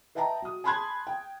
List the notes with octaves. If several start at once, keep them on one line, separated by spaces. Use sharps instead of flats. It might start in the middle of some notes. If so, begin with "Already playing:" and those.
B4 D#5 E5 G5 A5 A#5
F#3 D#6
G#5 A5 B5 C6 F#6 G#6
G5